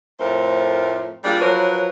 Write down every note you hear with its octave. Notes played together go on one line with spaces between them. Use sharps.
F2 A2 A3 A#4 C5
G3 A#3 D4 F4 G#4
F3 F#3 A#4 B4 C#5